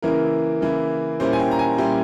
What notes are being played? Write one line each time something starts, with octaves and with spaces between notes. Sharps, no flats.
C#3 E3 A#3 E4 A#4
C#3 E3 A#3 E4
A#2 G3 A#3 C#4 E4 C5
G#5
G5
A#5
G#5
A#2 G3 A#3 C#4 E4 G5